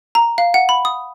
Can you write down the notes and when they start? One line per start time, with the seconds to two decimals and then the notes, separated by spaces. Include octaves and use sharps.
0.15 A#5
0.38 F5
0.54 F#5
0.69 B5
0.85 D#6